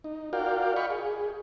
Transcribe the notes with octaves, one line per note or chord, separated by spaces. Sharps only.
D#4
F4 F#4 A#4 D5 F5 G5
D#5 F5 G5 B5 C#6
G#4